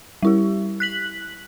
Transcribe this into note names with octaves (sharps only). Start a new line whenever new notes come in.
G3 E4 G4
F#6 B6 F#7